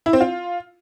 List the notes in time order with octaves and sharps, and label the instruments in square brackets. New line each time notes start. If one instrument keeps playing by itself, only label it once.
[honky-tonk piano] E4
C4
F4